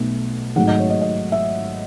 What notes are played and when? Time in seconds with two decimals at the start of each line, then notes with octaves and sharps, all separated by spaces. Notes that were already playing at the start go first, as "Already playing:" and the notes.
Already playing: B1 B2 A3
0.56 G#1 G#2 F#3 A3 F#5
0.67 D#5
0.79 C#5
0.90 D#5
1.01 D#5
1.32 E5